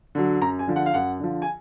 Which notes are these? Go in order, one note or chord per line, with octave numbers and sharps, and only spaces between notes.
D3 F#3
F#2 A#5
G#5
D3 F3
F#5
F5
F#2 F#5
D3 F3
G#5